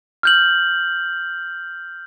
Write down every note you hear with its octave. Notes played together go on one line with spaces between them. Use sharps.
F6 G6 F#7